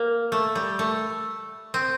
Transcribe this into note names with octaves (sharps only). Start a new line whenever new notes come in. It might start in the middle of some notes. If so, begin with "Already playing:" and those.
Already playing: A#3
A3
G3
A3
C4